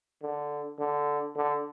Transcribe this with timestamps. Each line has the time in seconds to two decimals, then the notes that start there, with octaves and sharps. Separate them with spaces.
0.22 D3
0.79 D3
1.37 D3